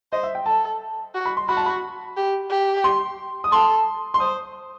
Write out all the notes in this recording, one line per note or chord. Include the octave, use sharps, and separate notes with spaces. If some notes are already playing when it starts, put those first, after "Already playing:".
C5 D#5
E5
G5
A4 A5
F#4
B5
C6
F#4 B5
A5
B5
G4
G4
C6
D#6
A4 C6
C6
C5 D#6